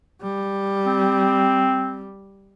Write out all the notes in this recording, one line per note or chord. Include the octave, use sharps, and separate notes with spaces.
G3
C4